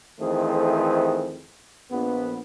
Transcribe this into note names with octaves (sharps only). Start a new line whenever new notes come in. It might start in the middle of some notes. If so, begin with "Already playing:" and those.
F2 D#3 E3 A3 G#4 C5
A#1 B3